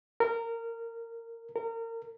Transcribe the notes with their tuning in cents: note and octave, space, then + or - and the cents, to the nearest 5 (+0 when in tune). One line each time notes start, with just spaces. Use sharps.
A#4 -20
A#4 -30